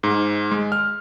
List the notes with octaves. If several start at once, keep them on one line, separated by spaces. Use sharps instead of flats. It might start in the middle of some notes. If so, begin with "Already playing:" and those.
G#2
G#3
F6